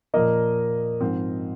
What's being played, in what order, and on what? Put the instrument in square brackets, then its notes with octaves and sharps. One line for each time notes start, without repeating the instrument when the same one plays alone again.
[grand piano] A#2 F3 A#3 D#5
G#2 F3 C4